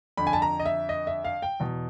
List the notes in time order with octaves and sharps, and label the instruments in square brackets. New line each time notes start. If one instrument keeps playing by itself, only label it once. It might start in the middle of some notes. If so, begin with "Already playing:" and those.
[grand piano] F2 D3 B5
G#5
A5
A#5
D#5
E5
D#5
E5
F5
G5
E2 B2